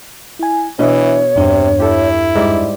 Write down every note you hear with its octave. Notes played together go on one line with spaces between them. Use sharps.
E4 G#5
B2 E3 B3 D4 C#5 E5
E2 G2 C3 D4
E4 G4 A4
G#2 G3 D5